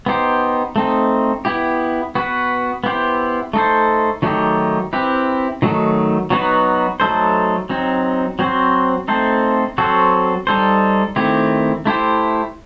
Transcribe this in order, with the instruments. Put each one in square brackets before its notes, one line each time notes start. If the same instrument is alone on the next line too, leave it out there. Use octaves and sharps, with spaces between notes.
[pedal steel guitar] B3 D#4 G4 C5
A3 C4 D#4
B3 E4 G4
B3 F#4 B4
B3 E4 G4 C5
A3 D#4 A4 C5
D#3 F#3 A3 D#4 G4
C4 E4 G4 B4
D#3 F#3 A3 D#4
F#3 B3 D#4 F#4 B4
F#3 A3 D#4 A4 C5
F#3 C4 D#4
F#3 C4 F#4 C5
A3 C4 D#4 A4 C5
F#3 C4 F#4 A4 C5
G3 D#4 A4 C5
D#3 A3 C4 E4 G4
A3 E4 G4 C5